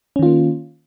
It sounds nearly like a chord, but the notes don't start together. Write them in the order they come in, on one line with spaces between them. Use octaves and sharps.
C#4 D#3 F4 A#3